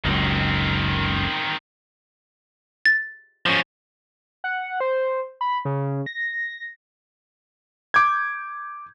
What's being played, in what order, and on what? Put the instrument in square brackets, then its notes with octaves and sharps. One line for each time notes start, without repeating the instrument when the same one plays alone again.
[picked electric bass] F#1 C#2 F#2 [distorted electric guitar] D#3 C4
[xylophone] A6
[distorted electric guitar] F3 C#4
[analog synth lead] F#5
C5
B5
C#3
A#6
[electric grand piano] D6 G6 G#6